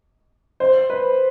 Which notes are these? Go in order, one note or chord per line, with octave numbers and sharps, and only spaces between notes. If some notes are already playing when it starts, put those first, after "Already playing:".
C5
B4